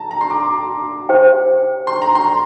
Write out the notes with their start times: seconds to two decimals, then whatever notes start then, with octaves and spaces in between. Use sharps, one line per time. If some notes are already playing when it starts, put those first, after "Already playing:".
Already playing: A5 A#5
0.11 A#5
0.21 C6
0.30 D6
1.09 G4 C5 G5
1.87 C6
2.02 A#5
2.15 C6